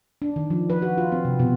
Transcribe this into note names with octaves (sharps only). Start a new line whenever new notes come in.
D4
D#3
F3
B4
F#4
F4
C4
C3
B2